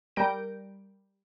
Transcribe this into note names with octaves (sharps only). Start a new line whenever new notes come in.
G3 A#4 G6 A#6 D7